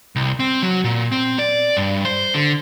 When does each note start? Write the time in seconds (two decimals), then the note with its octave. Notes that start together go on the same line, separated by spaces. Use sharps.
0.16 C2
0.40 C4
0.62 F#3
0.84 A#2
1.12 C4
1.39 D5
1.77 G2
2.05 C5
2.34 D3